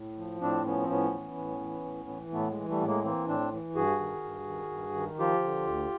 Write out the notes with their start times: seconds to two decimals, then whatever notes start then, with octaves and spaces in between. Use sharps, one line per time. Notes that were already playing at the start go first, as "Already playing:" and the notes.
Already playing: A2
0.18 F3
0.41 A2 C4 D4
0.65 F3 B3 C#4
0.81 C4
0.89 A2 B3 C#4
1.13 E3
1.37 A2
1.61 E3
1.85 A2
2.09 E3
2.32 A2 A3 B3
2.50 G#3
2.56 E3
2.68 G3 A3
2.81 A2 B3
2.87 G#3 A#3
3.04 E3 A#3 C4
3.28 A2 C4 D4
3.52 E3
3.75 G2 F#4 G#4
4.00 D#3
4.23 G2
4.47 D#3
4.71 G2
4.95 D#3
5.19 F3 F4 G4
5.43 D3
5.67 D2